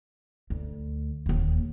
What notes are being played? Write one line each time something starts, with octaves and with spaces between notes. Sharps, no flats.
D2
D#1 D#2